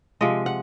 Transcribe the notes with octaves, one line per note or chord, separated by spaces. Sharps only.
C3 F3 G#3 D#5
F#5